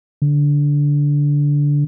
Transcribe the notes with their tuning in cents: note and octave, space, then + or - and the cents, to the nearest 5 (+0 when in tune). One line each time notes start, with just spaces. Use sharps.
D3 -15